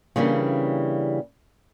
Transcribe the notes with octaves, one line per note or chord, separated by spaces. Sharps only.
C#3 E3 G3 A#3 C#4 D4